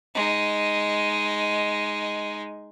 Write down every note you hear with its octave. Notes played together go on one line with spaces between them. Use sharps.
G#3 D#4